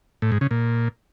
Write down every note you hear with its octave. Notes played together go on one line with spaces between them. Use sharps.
A2
G#2
C#3
A#2